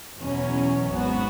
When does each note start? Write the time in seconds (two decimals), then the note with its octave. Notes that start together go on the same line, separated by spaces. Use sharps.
0.19 E2 B2 F#3 C#4
0.93 G#1 G#2 F#3 B3 F#4